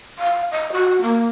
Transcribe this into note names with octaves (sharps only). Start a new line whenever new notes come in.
F5
D#5
F#4
A#3